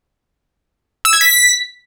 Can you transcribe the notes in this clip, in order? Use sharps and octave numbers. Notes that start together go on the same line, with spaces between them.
E6
G#6
B6